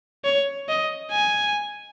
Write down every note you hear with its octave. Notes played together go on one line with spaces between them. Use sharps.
C#5
D#5
G#5